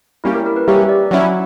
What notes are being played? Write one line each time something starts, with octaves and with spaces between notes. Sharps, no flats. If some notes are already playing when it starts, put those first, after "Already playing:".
G3 A#3 C#4 E4 G4
A#4
A#4
B4
G3 A#3 C#4 G4 E5
D5
F#3 C#4 E4 F#5